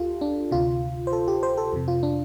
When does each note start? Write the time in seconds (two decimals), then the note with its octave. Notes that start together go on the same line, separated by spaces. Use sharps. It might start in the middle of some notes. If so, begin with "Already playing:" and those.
Already playing: D2 F4 G4 A4
0.21 D4
0.51 D2 C3 F4
1.07 C5
1.13 A4
1.28 G4
1.43 C5
1.57 A4
1.73 F2 C3
1.88 F4
2.03 D4